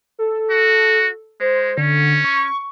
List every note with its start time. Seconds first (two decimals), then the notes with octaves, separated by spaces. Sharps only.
0.19 A4
0.50 F#4
1.40 G#3 C5
1.78 D3 C#4
2.25 C#6